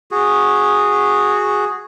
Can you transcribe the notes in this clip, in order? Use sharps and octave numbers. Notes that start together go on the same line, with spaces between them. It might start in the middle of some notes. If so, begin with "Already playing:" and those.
F#4 G#4